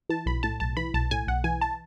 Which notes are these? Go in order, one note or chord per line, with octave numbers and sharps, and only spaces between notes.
E3 A5
B1 B5
A2 A5
B1 A5
E3 B5
B1 A5
A2 G#5
B1 F#5
E3 G#5
A5